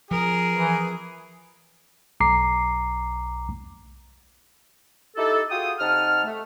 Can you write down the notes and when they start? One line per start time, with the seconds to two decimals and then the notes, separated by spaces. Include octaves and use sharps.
0.11 F3 G#4 A#4
0.54 E3
2.20 B1 A#5 D6 C7
5.16 D#4 E4 G4 A4
5.50 F4 F#4 G#4 G5 D#6
5.79 C3 D#4 F#5 A5 F6
6.25 A3